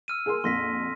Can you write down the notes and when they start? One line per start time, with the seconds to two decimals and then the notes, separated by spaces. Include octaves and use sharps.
0.08 E6 F6 D#7
0.26 G#4 A#4 C6
0.44 A#1 F2 C6 A#6 B6